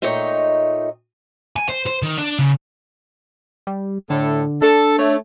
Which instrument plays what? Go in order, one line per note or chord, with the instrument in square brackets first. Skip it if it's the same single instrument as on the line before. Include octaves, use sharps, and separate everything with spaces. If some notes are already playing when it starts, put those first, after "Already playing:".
[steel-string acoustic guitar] A#2 A3 D#4 C#5 D#5 G5
[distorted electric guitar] G#5
C5
C5
D#3
D4
C#3
[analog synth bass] G3
[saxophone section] A2 A4 [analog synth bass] D3
[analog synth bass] D4 [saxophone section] A4
[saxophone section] A3 C#5